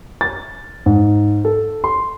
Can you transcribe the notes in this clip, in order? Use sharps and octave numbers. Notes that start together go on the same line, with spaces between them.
A6
G#2
A4
C6